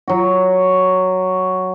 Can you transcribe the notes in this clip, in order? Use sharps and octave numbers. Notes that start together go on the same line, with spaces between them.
F#3 F#4